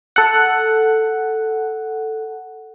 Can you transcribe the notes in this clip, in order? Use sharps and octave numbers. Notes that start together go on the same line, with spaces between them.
A4 F#5